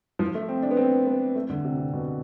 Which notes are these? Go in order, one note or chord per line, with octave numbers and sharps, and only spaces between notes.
F3
A3
C4
D4
B3
C4
B3
A3
D3
C3
C3
B2